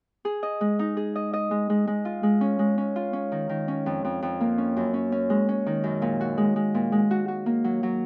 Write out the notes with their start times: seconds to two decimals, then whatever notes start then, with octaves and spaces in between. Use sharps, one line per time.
0.25 G#4
0.43 D#5
0.61 G#3
0.79 D#4
0.97 G#4
1.16 D#5
1.33 D#5
1.51 G#3
1.70 G#3
1.87 G#3
2.05 F4
2.23 G#3
2.41 C#4
2.59 G#3
2.78 C#4
2.96 F4
3.13 C#4
3.32 D#3
3.49 D#3
3.68 C#4
3.86 F2
4.04 F2
4.22 F2
4.40 A#3
4.58 C#4
4.77 F#2
4.94 C#4
5.12 C#4
5.30 G#3
5.49 C#4
5.66 D#3
5.84 F#2
6.02 A#2
6.21 F#4
6.38 G#3
6.56 G#3
6.74 A#2
6.92 G#3
7.11 F#4
7.28 F#4
7.46 A#3
7.64 F#3
7.83 F#3